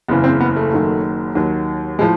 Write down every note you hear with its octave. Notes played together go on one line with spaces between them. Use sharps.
F#1 E2 C#3 E3 B3
C4
B3
A3
F#1 F#2 D#3 F#3
D#2 D#3 F#3
A2 F3 G#3